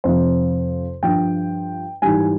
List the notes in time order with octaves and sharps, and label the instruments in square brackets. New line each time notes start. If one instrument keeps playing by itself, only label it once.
[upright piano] F2 C3 F3 C5
G2 F3 G5
G#2 E3 G3 G#5